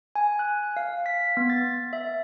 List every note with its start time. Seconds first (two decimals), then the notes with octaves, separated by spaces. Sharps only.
0.15 G#5
0.39 F#6
0.77 F5
1.06 B6
1.37 B3
1.50 A6
1.93 E5